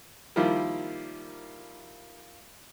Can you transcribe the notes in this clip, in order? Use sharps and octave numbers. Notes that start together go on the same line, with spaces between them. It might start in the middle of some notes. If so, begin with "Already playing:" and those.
D#3 F3 G3 A#3 E4 F4